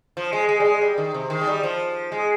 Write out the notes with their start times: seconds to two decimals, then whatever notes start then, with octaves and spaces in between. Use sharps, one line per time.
0.17 F3
0.32 G#3
0.49 G#3
0.60 G3
0.65 G#3
0.81 G3
0.98 D#3
1.14 C3
1.30 D#3
1.41 G#3
1.47 G3
1.63 F3
2.12 G#3